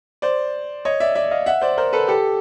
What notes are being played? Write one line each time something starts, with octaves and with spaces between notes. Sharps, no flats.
C5 D5
C#5 D#5
D5 E5
D5 E5
D#5 F5
E5 F#5
C5 D5
A#4 C5
A4 B4
G4 A4